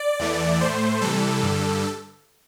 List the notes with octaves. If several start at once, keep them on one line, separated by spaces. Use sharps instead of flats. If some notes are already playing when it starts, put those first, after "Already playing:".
Already playing: D5
E2 E3 A3
A2 A3 C5
C3 E3 G3 A4
G2 D3 G3